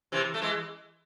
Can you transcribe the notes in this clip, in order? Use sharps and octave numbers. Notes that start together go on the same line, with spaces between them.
C3 E3
A3
E3 G#3